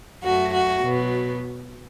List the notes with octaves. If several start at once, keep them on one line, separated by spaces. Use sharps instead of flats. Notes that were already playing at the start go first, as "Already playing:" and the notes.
F#2 F#3 A3 F#4
F#4
B2 F#3 B3